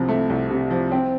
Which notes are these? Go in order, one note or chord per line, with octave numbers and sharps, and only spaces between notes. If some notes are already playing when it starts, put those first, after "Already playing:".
Already playing: C2 C3 F3
A3
C2
C3
F3
C4